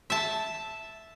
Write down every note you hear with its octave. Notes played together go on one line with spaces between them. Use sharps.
E5 A5